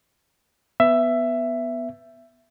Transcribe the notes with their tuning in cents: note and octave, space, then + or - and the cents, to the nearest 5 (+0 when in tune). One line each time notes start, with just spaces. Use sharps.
B3 +0 E5 +15